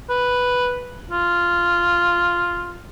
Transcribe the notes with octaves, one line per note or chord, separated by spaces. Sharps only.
B4
F4